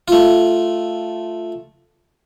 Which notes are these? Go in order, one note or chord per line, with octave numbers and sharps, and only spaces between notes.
A3 F4